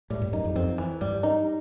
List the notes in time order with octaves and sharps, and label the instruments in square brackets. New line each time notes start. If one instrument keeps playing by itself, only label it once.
[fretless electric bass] A2 [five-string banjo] G3
[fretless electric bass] G2
[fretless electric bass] F#2 [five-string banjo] D#4
[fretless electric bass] F2
[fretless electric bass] F2 [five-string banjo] C4
[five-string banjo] E3
[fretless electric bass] G2 [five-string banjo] G3
[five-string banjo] D#4